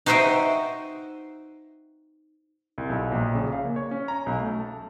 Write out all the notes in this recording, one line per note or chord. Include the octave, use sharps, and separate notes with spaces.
D#4 F#4 C5 D#5 E5 G5
C2
B1
A#1
C#3
F5
A#3
C#5
C#4
A#5
B1
A3
A5